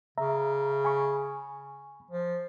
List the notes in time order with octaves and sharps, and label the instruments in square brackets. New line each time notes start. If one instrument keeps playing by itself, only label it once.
[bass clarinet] C#3 [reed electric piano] E5 A#5
[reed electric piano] G#5 B5 C#6
[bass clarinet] F3